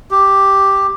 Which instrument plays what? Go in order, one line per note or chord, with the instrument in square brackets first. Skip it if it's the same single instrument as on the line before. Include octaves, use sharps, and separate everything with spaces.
[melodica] G4